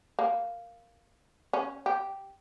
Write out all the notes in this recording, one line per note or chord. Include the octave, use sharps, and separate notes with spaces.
A#3
C#4
G4